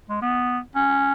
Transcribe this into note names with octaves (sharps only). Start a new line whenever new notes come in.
G#3
B3
C#4